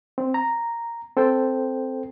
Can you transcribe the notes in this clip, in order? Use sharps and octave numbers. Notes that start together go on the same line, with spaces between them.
C4
A#5
C4 A4 C5 G5